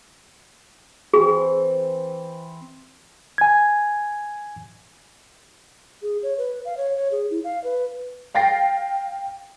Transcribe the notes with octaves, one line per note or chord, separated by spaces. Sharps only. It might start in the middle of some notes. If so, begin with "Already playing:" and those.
E3 C4 G#4
G#5 G#6
G#4
C#5
B4
F5
C#5
C#5
G#4
E4
F5
B4
F5 G5 A6 A#6 C7